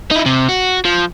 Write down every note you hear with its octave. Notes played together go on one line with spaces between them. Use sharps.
D#4 E4
C3
F#4
F3